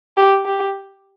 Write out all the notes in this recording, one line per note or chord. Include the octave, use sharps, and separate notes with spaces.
G4
G4